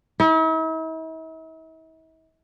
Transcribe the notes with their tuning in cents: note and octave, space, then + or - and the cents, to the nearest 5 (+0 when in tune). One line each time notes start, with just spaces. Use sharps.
E4 -45